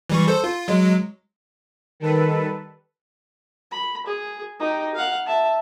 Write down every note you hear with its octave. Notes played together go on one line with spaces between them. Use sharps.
E3 G3 C#6
A4 C5
F4
F#3 G#3
D#3 G3 A4 B4
B5
G#4
D#4 G4
F5 F#5
E5 A5